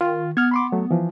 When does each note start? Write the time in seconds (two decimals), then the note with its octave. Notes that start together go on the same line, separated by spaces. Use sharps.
0.01 D#3 F4
0.37 B3 F6 G#6
0.51 B5 C6 D6
0.72 F#3 A3
0.91 E3 F3